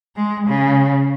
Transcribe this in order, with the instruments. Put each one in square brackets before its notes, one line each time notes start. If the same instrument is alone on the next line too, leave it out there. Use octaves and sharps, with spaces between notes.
[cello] G#3
C#3